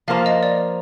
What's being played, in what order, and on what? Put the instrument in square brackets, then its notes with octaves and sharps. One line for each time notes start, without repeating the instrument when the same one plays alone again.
[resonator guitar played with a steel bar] F3 A#3 F4 C5 [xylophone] F5
[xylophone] D#5
D5